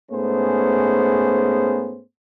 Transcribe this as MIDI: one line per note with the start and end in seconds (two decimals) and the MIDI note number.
0.11 2.02 44
0.11 2.02 57
0.11 2.02 59
0.11 2.02 61
0.11 2.02 68
0.11 2.02 72